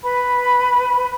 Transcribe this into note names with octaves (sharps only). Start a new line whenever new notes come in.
B4 B5